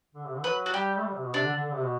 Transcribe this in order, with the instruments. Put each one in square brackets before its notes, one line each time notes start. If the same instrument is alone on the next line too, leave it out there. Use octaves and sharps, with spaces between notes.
[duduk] D3
C3
D3
[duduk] F#3 [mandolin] B4
[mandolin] F#4
[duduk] G3 [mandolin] G4
[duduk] A3
G3
C3
B2
[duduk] C3 [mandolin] D4
[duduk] D3
D3
D3
C3
B2